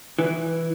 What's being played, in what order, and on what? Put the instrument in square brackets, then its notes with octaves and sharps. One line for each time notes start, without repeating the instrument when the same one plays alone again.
[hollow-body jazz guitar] E3